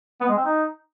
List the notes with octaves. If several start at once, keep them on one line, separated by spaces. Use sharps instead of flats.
B3
G#3
C4
D#4